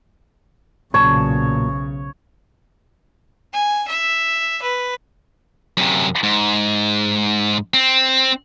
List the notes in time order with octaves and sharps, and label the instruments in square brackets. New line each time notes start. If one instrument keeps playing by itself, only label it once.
[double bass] B1 C#3 [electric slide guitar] A#2 F#3 A5 [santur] C#5
[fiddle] G#5
E5
B4
[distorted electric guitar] F#2 C3
G#2
C4